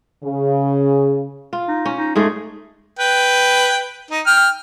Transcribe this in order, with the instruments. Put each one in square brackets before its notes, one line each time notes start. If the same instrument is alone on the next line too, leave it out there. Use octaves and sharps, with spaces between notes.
[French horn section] C#3
[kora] F4
[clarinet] D#4
[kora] C#4
[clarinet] D#4
[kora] G#2 G#3 A3 [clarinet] G#4
[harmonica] B4 G5
D#4
G5 F6